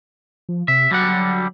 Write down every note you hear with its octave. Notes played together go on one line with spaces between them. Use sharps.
F3
C3 E5
D3 F#3 G3 F#5